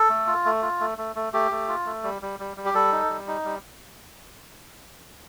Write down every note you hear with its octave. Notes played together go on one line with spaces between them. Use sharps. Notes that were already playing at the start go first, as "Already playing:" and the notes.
Already playing: A4
A3
F4
A3
F4
A3
A3
A3
A3 G4
A3
F4
A3
G3
G3
G3
G3
G4
G3 A4
D#4
G3
D#4
G3